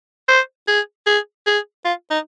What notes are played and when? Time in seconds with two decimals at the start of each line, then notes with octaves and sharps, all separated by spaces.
0.28 C5
0.68 G#4
1.06 G#4
1.46 G#4
1.85 F4
2.10 D#4